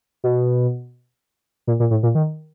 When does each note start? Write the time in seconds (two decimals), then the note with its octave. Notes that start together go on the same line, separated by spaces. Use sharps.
0.24 B2
1.67 A#2
1.80 A#2
1.91 A2
2.03 A#2
2.15 D#3